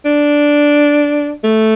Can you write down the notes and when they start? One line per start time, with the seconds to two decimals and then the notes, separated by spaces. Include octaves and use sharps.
0.05 D4
1.44 A3